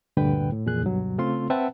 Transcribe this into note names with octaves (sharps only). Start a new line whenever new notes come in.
D2 G2 A#2 D3 B4 G5
A2
F2 A#2 E3 G#4 F#6
D2 G2 B2 F#3
C#3 A3 C4 F4 A4 C6
C4 B4 E5 F#5 G5 A5